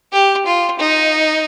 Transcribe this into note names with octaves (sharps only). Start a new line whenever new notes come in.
G4
F4
D#4